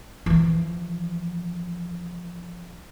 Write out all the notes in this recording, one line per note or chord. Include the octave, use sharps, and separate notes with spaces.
E3 F3